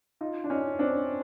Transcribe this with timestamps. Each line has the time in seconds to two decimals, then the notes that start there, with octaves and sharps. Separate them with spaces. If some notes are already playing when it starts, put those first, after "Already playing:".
0.21 D#4 F4
0.44 D4
0.50 C#4 D#4
0.79 C4 D4